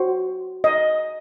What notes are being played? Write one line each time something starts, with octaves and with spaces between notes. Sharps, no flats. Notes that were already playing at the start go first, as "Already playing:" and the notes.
Already playing: F#4 C5
D#5